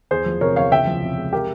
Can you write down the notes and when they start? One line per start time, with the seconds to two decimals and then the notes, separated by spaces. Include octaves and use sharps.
0.11 E2 G#4 C5
0.26 F3
0.41 C3 A#4 C#5
0.56 E2 C#5 F5
0.71 C#2 E5 G5
0.87 F3
1.02 C3
1.17 G#3
1.33 G4 A#4